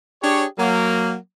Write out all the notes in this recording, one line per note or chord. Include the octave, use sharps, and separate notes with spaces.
D4 G4 G#4 C#5
F#3 A#3